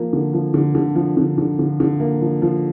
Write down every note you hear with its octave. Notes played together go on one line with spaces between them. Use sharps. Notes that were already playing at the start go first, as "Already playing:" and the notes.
Already playing: F3 A#3
D3
F3
D3
D3
F3
D3
D3
D3
D3
A#3
F3
F3